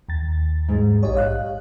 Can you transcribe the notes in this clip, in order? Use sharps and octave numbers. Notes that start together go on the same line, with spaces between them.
D#2 A6
G#2
A#1 G4 C#5 D#5
F5 F#6